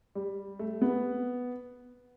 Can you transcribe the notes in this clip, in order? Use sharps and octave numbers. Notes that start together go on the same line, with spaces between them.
G3
A3
B3